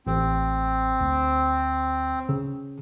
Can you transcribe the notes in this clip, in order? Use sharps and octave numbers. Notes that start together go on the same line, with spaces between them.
A1 C4
D2
C#3